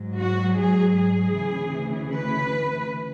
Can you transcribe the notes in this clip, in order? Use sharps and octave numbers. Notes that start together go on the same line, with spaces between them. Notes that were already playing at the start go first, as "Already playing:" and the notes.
Already playing: G#2 F#3
F#4
G#4
G#4
D2 C#3 E3
B4